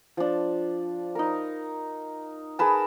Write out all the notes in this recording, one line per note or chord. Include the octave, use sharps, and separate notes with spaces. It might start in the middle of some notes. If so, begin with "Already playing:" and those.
F3 D4
D#4 A#4
G#4 A#4 B4 A5